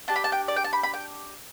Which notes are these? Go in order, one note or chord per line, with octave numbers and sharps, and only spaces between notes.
D4 G4 A5
B5
A5
G5
D5
G5
A5
B5
B5
G5